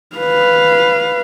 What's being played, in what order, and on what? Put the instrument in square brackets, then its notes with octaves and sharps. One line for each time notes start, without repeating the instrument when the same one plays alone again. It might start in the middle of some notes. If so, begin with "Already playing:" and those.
[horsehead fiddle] B4 F5